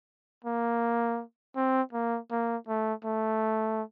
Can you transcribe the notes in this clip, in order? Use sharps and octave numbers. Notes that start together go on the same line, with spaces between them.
A#3
C4
A#3
A#3
A3
A3